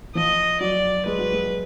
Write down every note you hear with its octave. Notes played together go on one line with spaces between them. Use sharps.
F3 D#5
F#3 D5
G#3 B4
F#3
G#3